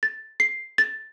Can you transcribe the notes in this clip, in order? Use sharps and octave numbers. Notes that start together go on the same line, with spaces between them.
A6
C7
A6